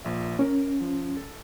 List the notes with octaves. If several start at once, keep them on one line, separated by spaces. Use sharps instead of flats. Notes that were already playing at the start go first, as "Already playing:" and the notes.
A#1 F3 E5
C#4 A#4
F3
A4